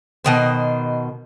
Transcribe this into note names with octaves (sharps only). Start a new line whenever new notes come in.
B2 D#3 C5